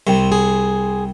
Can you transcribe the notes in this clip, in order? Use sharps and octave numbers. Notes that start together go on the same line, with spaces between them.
C2 C3
G#4